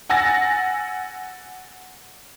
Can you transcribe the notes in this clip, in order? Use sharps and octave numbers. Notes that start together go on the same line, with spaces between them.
F#5 G#5 E6 A6 A#6